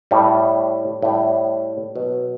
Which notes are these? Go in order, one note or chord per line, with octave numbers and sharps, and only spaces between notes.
A2 G3
A2 G3
B2 F#3